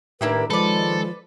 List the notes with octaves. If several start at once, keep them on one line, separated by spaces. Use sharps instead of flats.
A2 D#3 A#3 D4 E4 G4 B4
D#3 F3 G#3 A4 B4 D5